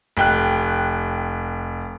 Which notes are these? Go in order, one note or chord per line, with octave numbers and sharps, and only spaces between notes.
F1 G5 F#6